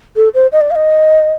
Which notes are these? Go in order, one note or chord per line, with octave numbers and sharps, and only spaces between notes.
A4
C5
D#5
D5
F5
D#5